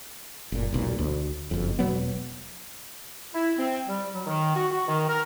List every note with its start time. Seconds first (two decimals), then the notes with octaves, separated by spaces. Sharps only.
0.52 F#1 A#2
0.72 E1 B1 A#2
0.99 D2
1.51 F#1 F2
1.79 E1 B2 F#3 B3
3.34 E4
3.58 C4
3.87 G3
4.13 F#3
4.26 D#3
4.56 F#4
4.70 F#4
4.87 D#3
5.08 A#4